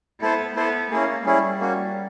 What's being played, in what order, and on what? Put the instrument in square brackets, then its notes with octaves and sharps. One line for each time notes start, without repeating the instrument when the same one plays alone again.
[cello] B3 [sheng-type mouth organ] E4 A4 C5
[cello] B3 [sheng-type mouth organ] E4 A4 C5
[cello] A#3 [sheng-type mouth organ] C#4 E4 G#4
[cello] G3 [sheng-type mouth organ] C#4 E4 G#4
[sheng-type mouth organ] A#3 C#4 F#4